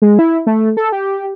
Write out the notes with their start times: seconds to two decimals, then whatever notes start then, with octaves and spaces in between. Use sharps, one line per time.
0.02 G#3
0.19 E4
0.47 A3
0.77 A4
0.92 G4